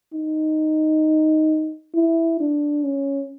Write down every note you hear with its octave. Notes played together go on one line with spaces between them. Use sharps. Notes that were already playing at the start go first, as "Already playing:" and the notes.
D#4
E4
D4
C#4